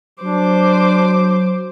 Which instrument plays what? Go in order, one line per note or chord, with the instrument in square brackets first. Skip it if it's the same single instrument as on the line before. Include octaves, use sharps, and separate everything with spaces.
[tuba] F#3 [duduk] D4 [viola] C5 D6